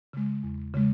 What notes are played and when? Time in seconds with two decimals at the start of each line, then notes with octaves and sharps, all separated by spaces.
0.13 C#3 G#3
0.43 E2
0.74 C#3 G#3